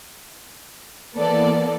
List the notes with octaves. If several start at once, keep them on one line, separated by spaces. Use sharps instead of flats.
E3 A#3 B3 A4 D5